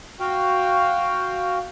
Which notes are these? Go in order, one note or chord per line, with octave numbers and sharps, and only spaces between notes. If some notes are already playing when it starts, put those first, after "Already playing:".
F#4 F5 G5